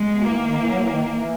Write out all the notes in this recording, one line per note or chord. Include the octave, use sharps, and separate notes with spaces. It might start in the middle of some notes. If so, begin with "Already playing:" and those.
Already playing: G#3
B2
E3 A#3
D#3
D#3
E3
F#3
E3
D#3
E3
D#3
E3